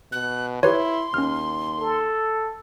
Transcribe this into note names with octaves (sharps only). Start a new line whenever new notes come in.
B2 F#6
E4 G4 B4 C#5 C6
D#2 C#4 F6
A4